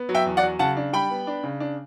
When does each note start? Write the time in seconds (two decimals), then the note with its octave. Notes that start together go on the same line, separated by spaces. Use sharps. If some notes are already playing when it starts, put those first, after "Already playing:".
Already playing: B3
0.09 F#3
0.15 E5 G5
0.26 E2
0.37 D5 F#5
0.43 F#3
0.59 C#3 F#5 A5
0.77 D4
0.93 G3 G5 B5
1.10 B3
1.27 D4
1.44 C#3
1.60 D4